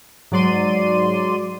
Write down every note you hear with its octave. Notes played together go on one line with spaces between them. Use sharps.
G#2 F#3 D5 C6 D#7